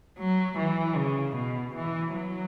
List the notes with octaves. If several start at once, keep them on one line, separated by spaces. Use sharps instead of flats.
F#3
E3
C#3
B2
E3
F#3